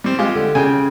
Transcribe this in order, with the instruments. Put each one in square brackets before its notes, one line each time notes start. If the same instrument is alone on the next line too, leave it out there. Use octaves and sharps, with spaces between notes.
[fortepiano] G3 C4
G#3 F4 G4
[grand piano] D3
[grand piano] C#3 [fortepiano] G5 G#5